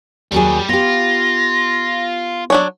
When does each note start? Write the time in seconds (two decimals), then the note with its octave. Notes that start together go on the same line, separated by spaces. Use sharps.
0.32 D#2 F#3 G3 G#4
0.69 B3 F4 G4 A#6
2.50 F#3 D4 C#5